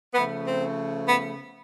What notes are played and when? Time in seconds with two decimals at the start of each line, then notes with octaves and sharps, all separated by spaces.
0.13 C#3 F3 A3 B3
0.45 C4
1.06 B3